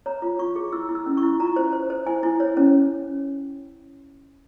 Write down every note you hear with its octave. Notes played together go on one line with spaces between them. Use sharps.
C#5 A#5
F4
F4 C#6
G#4
E4 E6
E4
E6
C#4
C#6
E4
F4 A#5
C5
C5
C5
E4 G#5
E4
C#5
C#4